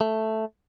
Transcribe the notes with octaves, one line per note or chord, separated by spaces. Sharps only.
A3